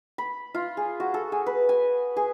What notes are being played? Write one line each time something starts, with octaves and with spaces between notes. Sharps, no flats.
B5
F4
G#4
F#4
A4
G#4
B4
G#5
G#4